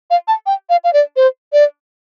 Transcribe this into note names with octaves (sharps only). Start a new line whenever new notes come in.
F5
A5
G5
F5
F5
D5
C5
D5